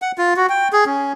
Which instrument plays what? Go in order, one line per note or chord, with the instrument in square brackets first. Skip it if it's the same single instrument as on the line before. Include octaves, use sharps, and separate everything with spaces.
[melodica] F#5
F4
F#4
G5
G#4
C#4